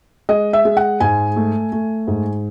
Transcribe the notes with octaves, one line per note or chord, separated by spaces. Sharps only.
G#3 D#5
E5
G#3
F#5
G#2 G#5
A3
A3
G#2